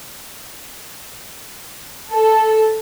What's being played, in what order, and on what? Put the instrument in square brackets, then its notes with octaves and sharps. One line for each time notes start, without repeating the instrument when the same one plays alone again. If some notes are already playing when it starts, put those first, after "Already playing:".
[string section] A4